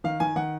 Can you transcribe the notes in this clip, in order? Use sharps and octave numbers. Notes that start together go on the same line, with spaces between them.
D#3 F5
D#3 G#5
D#3 F#5